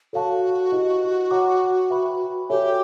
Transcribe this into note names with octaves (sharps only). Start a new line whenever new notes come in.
F#4 A4 C#5 F5 A5
E4 G4 B4 D#5
C#5 F#5 A#5 D6
B4 E5 G5 B5
F#4 G4 A4 C#5 E5 G#5